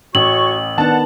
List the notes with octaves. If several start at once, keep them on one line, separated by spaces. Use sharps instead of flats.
A1 F#4 C#5 C#6 F#7
D#3 B3 D4 F#5 A5 A6